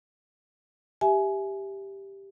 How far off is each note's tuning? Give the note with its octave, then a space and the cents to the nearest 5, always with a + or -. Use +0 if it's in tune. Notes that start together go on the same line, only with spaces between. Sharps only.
G4 +0 E5 +0 G#5 +20